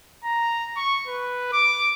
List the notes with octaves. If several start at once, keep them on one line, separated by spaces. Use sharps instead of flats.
A#5
C#6
B4
D6